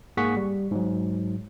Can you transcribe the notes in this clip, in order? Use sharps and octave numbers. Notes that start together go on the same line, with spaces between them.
G#2 A#3 G#4 F#5 C#6 B6
G3
G#2 F#3